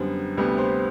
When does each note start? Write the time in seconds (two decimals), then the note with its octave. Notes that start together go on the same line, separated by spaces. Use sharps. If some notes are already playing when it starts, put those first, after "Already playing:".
Already playing: F#2 D3 G3 B3 C5
0.37 D2 C3 G3 B3
0.58 C5